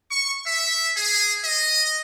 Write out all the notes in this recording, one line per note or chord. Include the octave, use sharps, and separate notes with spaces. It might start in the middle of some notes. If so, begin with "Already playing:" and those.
C#6
E5
G#4
D#5